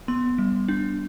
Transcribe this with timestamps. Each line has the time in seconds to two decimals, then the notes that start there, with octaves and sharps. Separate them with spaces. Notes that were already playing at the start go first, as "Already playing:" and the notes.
0.08 B3 C6
0.38 G3
0.68 D4